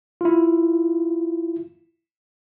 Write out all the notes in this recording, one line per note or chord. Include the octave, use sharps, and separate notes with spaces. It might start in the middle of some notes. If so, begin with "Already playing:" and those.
E4 F4